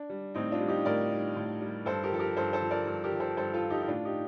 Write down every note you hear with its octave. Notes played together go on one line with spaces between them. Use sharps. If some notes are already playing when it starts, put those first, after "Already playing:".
Already playing: D4
G3
A2 C4 D#4
D4 F4
G3
D#4 G4
A2 A#4 D5
G3
A2
G3
G2 A4 C5
G4 A#4
F3 A4
G4 A#4
G2 A4 C5
A4 C5
F3
A#4 D5
G2
G4 A#4
F3
A4 C5
G2 A4 C5
F4 A4
F3
D#4 G4
D#4
A2 D4 F4
D#4 G4